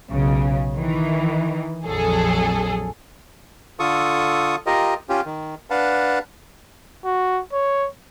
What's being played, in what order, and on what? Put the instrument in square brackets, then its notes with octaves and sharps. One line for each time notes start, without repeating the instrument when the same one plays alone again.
[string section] B1 C#3
D#3 E3
A#1 F2 F#3 G#4 A4
[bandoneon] D3 F4 A4 C#6 D#6
F4 G4 A#4 D#5
C#4 F4 G4
D#3
D4 B4 F5 F#5 A5
[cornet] F#4
C#5